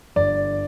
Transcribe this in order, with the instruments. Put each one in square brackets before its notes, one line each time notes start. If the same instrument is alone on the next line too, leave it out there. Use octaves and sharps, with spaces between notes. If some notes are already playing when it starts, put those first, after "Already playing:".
[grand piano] G1 D5